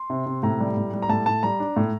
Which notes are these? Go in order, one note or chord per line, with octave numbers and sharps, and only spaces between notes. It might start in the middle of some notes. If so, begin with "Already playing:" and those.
Already playing: C6
C3
C3
A2 A#5
G3
A2
G3
A#5
A2 A5
A2 A5
G3 A#5
D4
A2